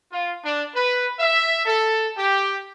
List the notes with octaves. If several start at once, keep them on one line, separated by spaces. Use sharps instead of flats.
F4
D4
B4
E5
A4
G4